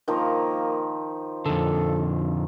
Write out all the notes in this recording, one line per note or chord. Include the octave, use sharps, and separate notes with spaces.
D#3 F3 A#3
F2 D3 A4